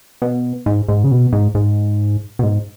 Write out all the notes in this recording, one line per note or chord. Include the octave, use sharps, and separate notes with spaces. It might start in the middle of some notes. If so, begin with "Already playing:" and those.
B2
G#2
G#2
C#3
B2
G#2
G#2
B2
G#2